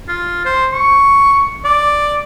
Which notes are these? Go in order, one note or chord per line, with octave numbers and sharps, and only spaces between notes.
F4
C5
C#6
D5